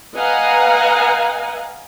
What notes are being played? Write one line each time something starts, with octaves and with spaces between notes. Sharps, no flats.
B4 D#5 F5 F#5 G#5 A#5